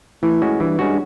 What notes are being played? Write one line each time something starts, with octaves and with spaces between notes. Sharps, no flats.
A2 E3
G#3 C#4 F#4
G2 E3
G2 G#3 C#4 F#4